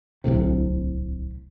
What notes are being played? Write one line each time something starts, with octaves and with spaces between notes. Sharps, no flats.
D1 C2 A2 C3